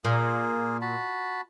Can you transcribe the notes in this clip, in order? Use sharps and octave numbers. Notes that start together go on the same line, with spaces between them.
A#2 A#3 F4 G#4
F#4 A5 B5